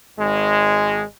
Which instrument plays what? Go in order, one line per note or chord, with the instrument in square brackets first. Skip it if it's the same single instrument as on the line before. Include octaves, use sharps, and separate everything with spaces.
[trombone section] G#1 G#3